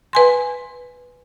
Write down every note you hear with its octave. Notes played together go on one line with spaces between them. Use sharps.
B4 G#5 C6